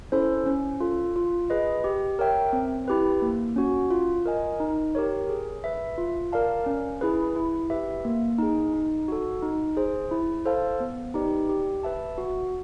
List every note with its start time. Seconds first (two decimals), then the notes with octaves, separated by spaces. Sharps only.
0.12 C#4 E4 A4 C5
0.46 C#4
0.80 F4 A4
1.16 F4
1.50 G#4 B4 D#5
1.84 G4
2.19 A#4 C#5 E5 G5
2.53 C4
2.88 E4 G4 B4
3.22 A#3
3.56 C#4 F#4
3.91 F4
4.26 A#4 D#5 G#5
4.60 D#4
4.95 G4 A#4 C#5
5.29 G#4
5.64 B4 E5
5.98 F4
6.32 A#4 D5 F5 A5
6.66 C#4
7.01 E4 G#4 B4
7.36 E4
7.70 G4 B4 E5
8.05 A#3
8.38 D#4 G#4
8.74 D#4
9.08 F#4 A4
9.43 D#4
9.77 G#4 C5
10.11 E4
10.46 A4 C5 F5 A5
10.80 B3
11.14 D#4 G4 B4 D5
11.49 G4
11.83 B4 E5 A5
12.18 F#4